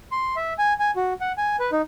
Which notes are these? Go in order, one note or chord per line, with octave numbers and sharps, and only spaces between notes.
C6
E5
G#5
G#5
F#4
F#5
G#5
B4
D#4